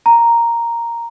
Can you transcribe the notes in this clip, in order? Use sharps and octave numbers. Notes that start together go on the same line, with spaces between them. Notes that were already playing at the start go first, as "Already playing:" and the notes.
A#5